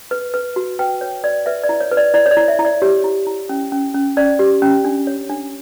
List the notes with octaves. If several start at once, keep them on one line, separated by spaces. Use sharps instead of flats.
B4
B4
F#4
B4 G5
B4 C#5
B4 D5
B4 E5
D5
E4
C#5
B4
D5
E4 D5
C#5
D5
E4
E5
E4
D5
G4 C#5
E4
E4
C#4
C#4
C#4
C#4 D5
G4
C#4
D4
C#5
D4